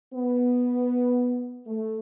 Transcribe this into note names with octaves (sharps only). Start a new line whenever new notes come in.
B3
A3